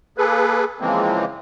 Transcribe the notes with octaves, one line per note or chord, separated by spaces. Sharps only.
A#3 G#4 A4 B4
C#3 E3 F3 G#3 A#3 C4